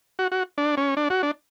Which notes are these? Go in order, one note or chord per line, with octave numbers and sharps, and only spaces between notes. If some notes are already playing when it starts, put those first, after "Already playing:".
F#4
F#4
D4
C#4
D4
F#4
D4